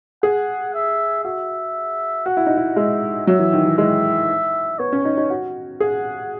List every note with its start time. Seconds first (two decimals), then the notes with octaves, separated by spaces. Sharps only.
0.23 G#4 F#5
0.74 E5
1.24 F#4 E5
2.26 F#4 F#5
2.37 E4
2.47 D#4
2.57 E4
2.76 G#3 E5
3.27 F#3 E5
3.39 E3
3.53 D#3
3.65 E3
3.78 G#3 E5
4.79 B3 C#5
4.93 C#4
5.05 D#4
5.17 D#4
5.30 F#4
5.80 G#4 F#5